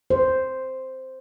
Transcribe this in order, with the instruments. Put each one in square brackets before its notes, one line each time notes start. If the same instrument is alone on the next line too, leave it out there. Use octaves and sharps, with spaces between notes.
[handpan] C5